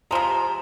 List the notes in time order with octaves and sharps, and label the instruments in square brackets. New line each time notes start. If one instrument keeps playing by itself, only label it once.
[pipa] C3 F3 G#3 [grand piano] A#5